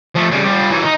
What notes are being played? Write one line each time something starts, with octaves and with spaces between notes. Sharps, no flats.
F3 A3
C#3 G3
G3 F4
E3 F#3
D#4